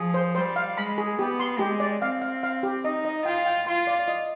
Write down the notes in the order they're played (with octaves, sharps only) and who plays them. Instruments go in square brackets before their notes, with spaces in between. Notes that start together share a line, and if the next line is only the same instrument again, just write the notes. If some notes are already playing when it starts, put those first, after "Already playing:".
Already playing: [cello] F3 [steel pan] G#4
[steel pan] C5
[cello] G3 [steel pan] C5
[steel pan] F5
[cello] G#3 [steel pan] B5
[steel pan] G#4
[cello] B3 [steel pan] G4
[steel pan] C6
[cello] G#3 [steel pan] G4
[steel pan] D5
[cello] C4 [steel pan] F5
[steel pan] F5
F5
G4
[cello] D#4 [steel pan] D#5
[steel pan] D#5
[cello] F4 [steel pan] G5
[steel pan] G5
[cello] F4 [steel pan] C6
[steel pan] D5
D#5